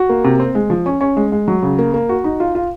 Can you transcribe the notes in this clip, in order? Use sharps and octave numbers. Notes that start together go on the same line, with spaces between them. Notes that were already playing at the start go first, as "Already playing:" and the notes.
Already playing: F#4
A#3
C3
C4
G#3
F3
C#4
C#4
G#3
G#3
F#3
C#3
A#3
A#3
F#4
D#4
F4
F4